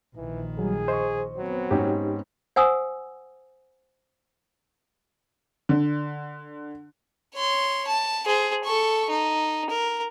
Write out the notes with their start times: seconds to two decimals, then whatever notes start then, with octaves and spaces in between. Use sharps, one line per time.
0.16 A#1 D#3 E3
0.59 F#3 G3 G#4
0.88 C5 D#5 C#6
1.37 F#3 B3 C4
1.71 G#2 C#4 D#4 G4
2.56 C5 F#5 G#5 D#6 E6
5.69 D3
7.34 C#5 C6
7.88 A5
8.26 G#4 C5
8.65 A4 C#6
9.09 D#4
9.70 A#4